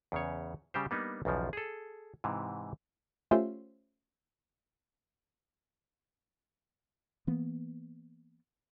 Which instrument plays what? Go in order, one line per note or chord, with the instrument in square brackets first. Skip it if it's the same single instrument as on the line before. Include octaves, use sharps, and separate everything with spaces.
[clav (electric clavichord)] E2 C#3 C#5
C#3 G3 G4 C5
G3 A#3 B3 D4 D#4
B1 E2 C#3 F3
G#4 A4
G#2 C3 E3
[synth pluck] A3 C#4 F4 G4 C5 E5
[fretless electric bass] E3 A#3 B3